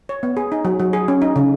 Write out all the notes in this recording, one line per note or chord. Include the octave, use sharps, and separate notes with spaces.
C#5
B3
G#4
D#4
F#3
F#3
G#4
C#4
D#4
C#3